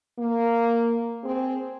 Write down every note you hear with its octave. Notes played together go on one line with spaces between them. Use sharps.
A#3
C4 G#4